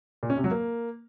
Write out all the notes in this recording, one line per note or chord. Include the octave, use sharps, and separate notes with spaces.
A#2
C#4
C3
F#3
A#3